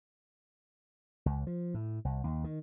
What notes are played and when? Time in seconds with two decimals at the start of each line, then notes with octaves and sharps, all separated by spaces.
1.26 C#2
1.47 F3
1.74 A2
2.05 C2
2.24 D#2
2.44 D#3